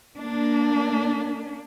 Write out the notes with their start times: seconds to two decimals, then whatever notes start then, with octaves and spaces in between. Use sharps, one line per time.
0.17 A#3 D4